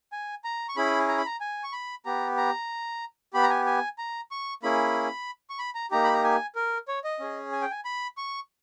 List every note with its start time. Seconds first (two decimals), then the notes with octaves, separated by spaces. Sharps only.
0.12 G#5
0.44 A#5
0.69 C#6
0.77 C#4 E4 G#4 B5
1.08 A#5
1.18 B5
1.26 A#5
1.41 G#5
1.64 C#6
1.73 B5
2.05 B3 G4 A#5
2.37 A#5
3.33 B3 G4 B5
3.43 A#5
3.50 G#5
3.66 G#5
3.98 A#5
4.31 C#6
4.63 A#3 C#4 E4 G#4 B5
5.50 C#6
5.59 B5
5.75 A#5
5.91 A#3 D#4 G4 A#5
6.04 B5
6.13 A#5
6.24 G#5
6.55 A#4
6.88 C#5
7.04 D#5
7.20 C#4 G#4
7.52 G#5
7.62 G5
7.71 G#5
7.85 B5
8.17 C#6